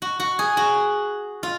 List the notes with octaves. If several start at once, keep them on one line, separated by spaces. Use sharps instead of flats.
F#4
F#4
G#4
F#4
F4